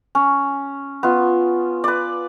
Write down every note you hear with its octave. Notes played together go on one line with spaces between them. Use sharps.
C#4
B3 F4
B4 D5